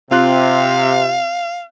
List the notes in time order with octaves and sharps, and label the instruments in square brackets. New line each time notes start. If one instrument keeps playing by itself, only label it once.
[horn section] C3 [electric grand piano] C4 F4 F#6 [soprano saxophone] F5